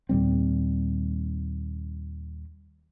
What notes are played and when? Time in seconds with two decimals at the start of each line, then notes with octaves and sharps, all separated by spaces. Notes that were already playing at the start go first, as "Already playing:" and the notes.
0.09 D#2 A#2 G3 C4